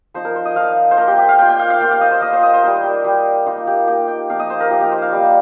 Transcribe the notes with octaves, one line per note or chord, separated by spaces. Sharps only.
F3 D#4 C5
A#4
C5
D#5
F3 D#4 F5
C5
A#3 F4 A#4
G4
G4
F5
A#3 F4 G5
G5
F5
F5
A#3 F4 G5
F5
D#5
C5
A#3 F4 D#5
C5
D#5
C5
G3 D#4 A#4
G4
G3 D#4 G4
A#3 D#4 F4
G4
A#3 D#4 G4
G5
F3 A#3 D#4 F5
D#5
C5
A#4
F3 A#3 D#4 G4
G4
C5
F5
G3 A#3 D#4